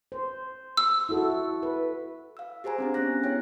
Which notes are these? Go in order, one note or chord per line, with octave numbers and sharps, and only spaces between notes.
C5
E6
E4 F#4 A4
B4
F5 E6
G4 G#4 C5 G#5 A#5
C4 D4 G4
B3 C#4 F#6 A#6
B3 E4 C#5 G5